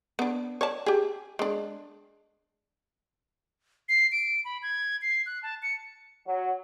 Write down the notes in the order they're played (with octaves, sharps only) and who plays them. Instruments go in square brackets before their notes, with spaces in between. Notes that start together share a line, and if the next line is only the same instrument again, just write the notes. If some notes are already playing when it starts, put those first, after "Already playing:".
[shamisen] B3 D4
C#5 D5 A5
G4 G#4
G#3 D4
[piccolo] C7
D7
B5
G#6
C7
F#6
A5
C#7
[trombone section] F#3